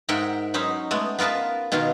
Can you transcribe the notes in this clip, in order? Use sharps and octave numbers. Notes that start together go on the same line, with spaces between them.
G#2 A#4 E5 F#5 G5 C6
F#3 C#4 D#4 C5 B5
G#3 A3 B3
B3 F4 A#4 B4 A5
B2 D#3 A#3 F4 A#4